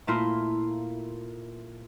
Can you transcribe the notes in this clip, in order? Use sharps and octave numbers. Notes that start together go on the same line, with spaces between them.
A#2 A3 A#3 E4 F4 C6